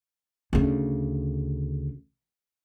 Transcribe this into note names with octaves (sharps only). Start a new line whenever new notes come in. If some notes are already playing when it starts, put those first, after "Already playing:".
D2 C#3